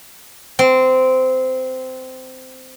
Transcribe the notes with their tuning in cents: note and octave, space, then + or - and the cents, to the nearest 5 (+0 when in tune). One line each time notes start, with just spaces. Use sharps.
C4 -15